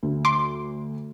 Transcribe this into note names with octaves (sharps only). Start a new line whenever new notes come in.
D2
C6 D6